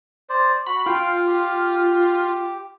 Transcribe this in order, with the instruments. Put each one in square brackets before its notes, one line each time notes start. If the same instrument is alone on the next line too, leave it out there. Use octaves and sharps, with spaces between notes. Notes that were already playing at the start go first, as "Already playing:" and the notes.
[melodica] C5 D5
[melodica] F#4 [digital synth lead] B5
[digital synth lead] F4 [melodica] F5 G5
[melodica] G4